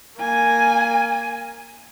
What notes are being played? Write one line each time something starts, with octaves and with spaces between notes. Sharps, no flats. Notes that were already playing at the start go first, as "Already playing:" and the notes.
A#3 G#5